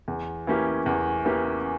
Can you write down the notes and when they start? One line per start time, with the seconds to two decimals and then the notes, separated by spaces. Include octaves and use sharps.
0.08 E2
0.47 E3 A#3 C#4 G4
0.86 E2
1.25 E3 A#3 C#4 G4